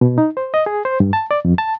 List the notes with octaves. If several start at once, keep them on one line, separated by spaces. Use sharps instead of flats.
B2
D#4
C5
D#5
G#4
C5
G2
A5
D5
F2
A5